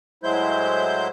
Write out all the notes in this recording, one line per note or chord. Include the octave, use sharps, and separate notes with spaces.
A2 F#3 G#3 E4 C5 G6